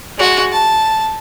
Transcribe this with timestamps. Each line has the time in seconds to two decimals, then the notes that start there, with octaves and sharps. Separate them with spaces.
0.18 G#3 F#4
0.52 A5